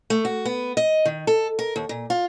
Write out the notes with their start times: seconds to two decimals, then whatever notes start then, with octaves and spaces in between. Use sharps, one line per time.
0.10 A3
0.25 F#4
0.45 B3
0.77 D#5
1.05 D#3
1.27 A4
1.59 A#4
1.76 D#2
1.89 A#2
2.10 F4